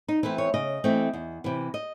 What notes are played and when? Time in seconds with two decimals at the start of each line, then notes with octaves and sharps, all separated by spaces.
0.08 D#4
0.23 E3 A3 C4 E4
0.38 C#5
0.54 C#3 D#5
0.84 E3 A3 C4
1.14 E2
1.44 C3 E3
1.74 D#5